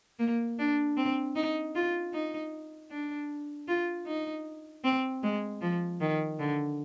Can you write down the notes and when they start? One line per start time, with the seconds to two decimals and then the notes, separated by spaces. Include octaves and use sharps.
0.19 A#3
0.59 D4
0.97 C4
1.36 D#4
1.75 F4
2.14 D#4
2.91 D4
3.68 F4
4.07 D#4
4.84 C4
5.23 G#3
5.62 F3
6.01 D#3
6.39 D3